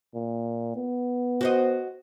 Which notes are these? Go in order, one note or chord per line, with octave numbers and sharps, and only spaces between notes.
A#2
B3
F#4 C5 D#5